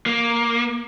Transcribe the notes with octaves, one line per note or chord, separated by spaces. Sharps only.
A#3